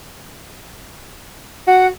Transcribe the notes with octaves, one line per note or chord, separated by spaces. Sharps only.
F#4 F#5